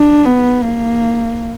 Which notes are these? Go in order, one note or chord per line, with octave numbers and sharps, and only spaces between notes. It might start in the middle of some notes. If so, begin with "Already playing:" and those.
Already playing: D4
B3
A#3